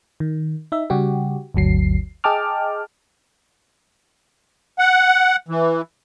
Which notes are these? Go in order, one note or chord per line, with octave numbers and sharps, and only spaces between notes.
D#3
D#4 E5
C#3 G3 F#4 G4
G1 D2 F#3 C7
G#4 D#5 G5 A5 D6 F6
F#5
E3